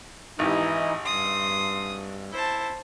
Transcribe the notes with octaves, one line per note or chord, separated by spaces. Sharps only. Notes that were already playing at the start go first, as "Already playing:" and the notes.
G#1 E3 D#4 E4 G4 D#5
G2 C6 D#6
E4 C5 A5